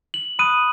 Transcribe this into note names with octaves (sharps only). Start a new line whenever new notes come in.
F#7
B5 D#6 F#6 D#7